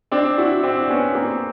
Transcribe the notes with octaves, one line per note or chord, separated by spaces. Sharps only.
C4 D4
E4 F#4
C4 D4
B3 C#4
A#3 C4